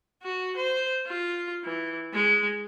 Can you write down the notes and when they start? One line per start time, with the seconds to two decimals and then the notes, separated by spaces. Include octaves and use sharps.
0.23 F#4
0.57 C5
1.07 F4
1.65 E3
2.14 G#3